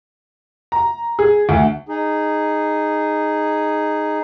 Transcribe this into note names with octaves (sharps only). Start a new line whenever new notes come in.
A#5
G#4
D2
D#4 G#4